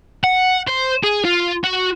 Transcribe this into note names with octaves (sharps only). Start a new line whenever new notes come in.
F#5
C5
G#4
F4
F#4